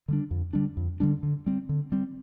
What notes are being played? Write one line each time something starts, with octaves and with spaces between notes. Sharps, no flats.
D3 G3 D4
F2
D3 G3 D4
F2
D3 G3 D4
D3
G3 C4
D3
G3 C4